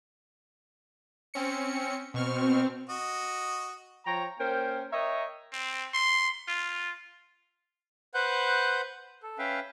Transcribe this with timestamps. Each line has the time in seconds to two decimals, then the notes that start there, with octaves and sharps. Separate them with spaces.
1.34 C4 C#4 C#7
2.14 B2 C4 C#6 F6
2.89 F#4 D#5
4.06 F3 C#5 G5 A#5
4.39 A#3 C#4 A#4 C5 G5
4.93 A#4 C#5 D#5 E5 G5 A#5
5.53 C4
5.94 C6
6.48 F4
8.14 B4 C5 F#5 F#6 G6
9.23 A4
9.38 C#4 B4 E5 F5 G5